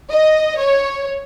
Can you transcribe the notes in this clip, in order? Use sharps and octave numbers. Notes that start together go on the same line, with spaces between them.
D#5
C#5